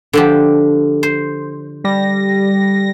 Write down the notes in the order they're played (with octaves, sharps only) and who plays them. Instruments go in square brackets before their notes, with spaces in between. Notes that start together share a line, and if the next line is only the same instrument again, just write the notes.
[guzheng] D3 F3 G4
C5
[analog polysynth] G3 A#6